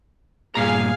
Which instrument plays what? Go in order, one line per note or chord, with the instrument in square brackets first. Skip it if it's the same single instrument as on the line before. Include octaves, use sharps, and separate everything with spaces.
[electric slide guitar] G2 A#2 A#5 [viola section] G#4 F5 G#5